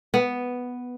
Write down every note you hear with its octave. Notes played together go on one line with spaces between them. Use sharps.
B3